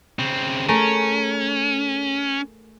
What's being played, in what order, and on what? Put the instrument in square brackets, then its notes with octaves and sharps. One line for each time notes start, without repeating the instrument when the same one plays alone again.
[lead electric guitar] C#3 C4
[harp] A3 G#4 A#4 [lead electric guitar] C#4